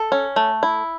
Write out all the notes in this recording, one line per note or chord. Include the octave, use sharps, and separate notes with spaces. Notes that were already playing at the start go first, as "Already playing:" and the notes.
Already playing: A4
C#4
A3
E4